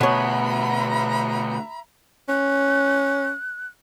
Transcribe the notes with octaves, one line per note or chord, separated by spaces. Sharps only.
D2 B2 B3 C#5 E5 A#5 B5
C#4 F#6